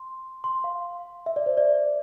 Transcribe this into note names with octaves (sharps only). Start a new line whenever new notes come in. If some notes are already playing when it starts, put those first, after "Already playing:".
Already playing: C6
C6
F5
E5
D5
C5
D5